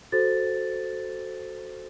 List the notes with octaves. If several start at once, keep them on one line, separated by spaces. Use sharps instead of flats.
F#4 A4 C5 A6